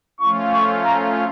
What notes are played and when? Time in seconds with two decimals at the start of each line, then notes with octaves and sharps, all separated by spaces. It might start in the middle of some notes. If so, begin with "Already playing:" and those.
0.20 F3 A3 C#4 F4 C#6
0.53 C#6
0.85 A#5